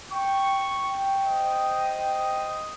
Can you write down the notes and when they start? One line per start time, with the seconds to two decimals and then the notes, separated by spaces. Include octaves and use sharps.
0.12 G5 C#6
0.84 G5
1.26 C5 D#5